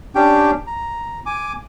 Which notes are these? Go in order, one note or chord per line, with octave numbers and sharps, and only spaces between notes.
C#4 D4 G4 G5
A#5
G#5 D6